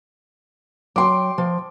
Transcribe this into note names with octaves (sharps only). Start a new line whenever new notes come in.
F#3 G5 C6 D6
F3